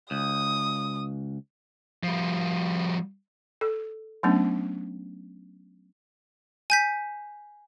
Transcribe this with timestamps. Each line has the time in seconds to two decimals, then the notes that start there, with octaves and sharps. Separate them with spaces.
0.11 C#2 D#6
2.03 F3 G3
3.61 A4
4.23 F#3 A3 B3 C#4 D4
6.70 G#5 G6 B6